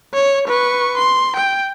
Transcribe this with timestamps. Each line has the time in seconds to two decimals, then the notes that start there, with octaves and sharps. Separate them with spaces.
0.14 C#5
0.48 B4 C#6
0.98 C6
1.36 G5